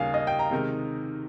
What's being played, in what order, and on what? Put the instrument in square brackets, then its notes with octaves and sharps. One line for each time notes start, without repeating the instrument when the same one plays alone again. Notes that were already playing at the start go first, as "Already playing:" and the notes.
Already playing: [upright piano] D#2 C#3 G3 A#3 [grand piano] F5 G#5
[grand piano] D#5
G5
A#5
[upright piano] C3 D#3 G#3 D#4 A#4